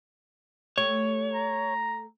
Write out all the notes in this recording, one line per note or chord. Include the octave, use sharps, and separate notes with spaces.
A3 G4 C#5
A#5